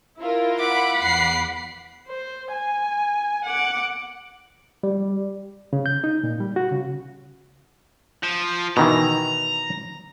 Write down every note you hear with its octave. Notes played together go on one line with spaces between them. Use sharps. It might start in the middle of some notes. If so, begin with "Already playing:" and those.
E4 F4 A#4
F#5 B5 D6
E2 D6 C7
C5
G#5
F#5 D6
G3
C#3
G6
D#4
A#2
G3
F#4
C#3
F3
B2 D#3 E3 A#5